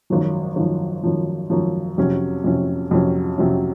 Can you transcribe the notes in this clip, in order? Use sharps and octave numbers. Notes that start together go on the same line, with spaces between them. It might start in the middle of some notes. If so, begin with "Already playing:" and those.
G#1 F#2 F3
G#1 F#2 F3
G#1 F#2 F3
G#1 F#2 F3
F2 C3 F#3 C#4
F2 C3 F#3 C#4
F2 C3 F#3 C#4
F2 C3 F#3 C#4